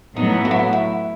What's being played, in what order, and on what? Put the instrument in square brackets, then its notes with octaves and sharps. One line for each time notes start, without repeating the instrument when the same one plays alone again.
[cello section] A2 F#3 B3 [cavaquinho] D#4
[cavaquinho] F#4
E4
F#4
E4